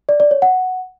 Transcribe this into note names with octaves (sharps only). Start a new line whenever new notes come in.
D5
D5
C#5
F#5